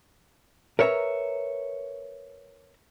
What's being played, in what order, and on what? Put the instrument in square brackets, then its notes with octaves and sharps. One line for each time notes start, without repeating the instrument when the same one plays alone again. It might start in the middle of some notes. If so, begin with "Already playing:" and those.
[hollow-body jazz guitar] A#4 B4 C#5 E5 A5 A#5